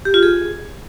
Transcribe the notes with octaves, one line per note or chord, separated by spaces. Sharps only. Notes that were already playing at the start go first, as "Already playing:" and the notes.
G4
F4
G#4